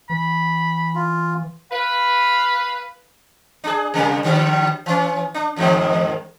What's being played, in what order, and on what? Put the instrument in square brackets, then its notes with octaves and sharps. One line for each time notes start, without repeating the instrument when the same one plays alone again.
[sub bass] E3 [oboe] B5
[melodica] F4
[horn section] B4 F5
[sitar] D4 G#4
C3 G3 A#3
D3 F#3 G3
E3 C#4
D4
E2 G#2 D#3